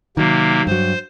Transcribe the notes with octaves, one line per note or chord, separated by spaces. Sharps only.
C3 D#3 F#3 A#3
G2 F#3 C5